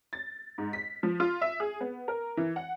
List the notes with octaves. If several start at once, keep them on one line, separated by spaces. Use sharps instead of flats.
A6
G#2
B6
F3
F4
E5
G#4
B3
A#4
E3
F#5